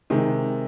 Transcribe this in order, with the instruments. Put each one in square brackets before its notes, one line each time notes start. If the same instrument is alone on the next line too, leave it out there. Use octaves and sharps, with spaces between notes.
[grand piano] C3 D#3 G#3